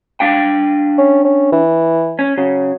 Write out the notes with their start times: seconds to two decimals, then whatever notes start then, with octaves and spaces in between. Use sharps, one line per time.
0.20 D4 F5 G5
0.99 C#4
1.25 C#4
1.53 E3
2.19 C#4
2.38 C#3 F#3